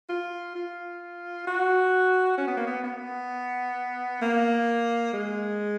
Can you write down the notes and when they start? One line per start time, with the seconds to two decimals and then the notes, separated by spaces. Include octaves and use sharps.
0.09 F4
0.55 F4
1.47 F#4
2.38 C#4
2.47 B3
2.57 A#3
2.67 B3
2.84 B3
4.22 A#3
5.13 G#3